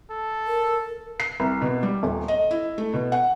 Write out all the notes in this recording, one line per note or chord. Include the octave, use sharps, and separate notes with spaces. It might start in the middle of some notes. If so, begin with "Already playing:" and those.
A4
A#4
C7
C2
B2
G3
D#1
D#5
E4
A3
B2
F#5